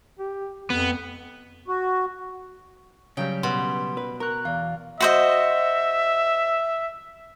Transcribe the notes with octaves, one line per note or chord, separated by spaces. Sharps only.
G4
F2 B3
F#4
C#3 F#3 G3 C#5 G5 G6
B2 C6
B4
A#4 A#5 C#6 F#6
E2 D5 F5
F#4 C5 D#5 E5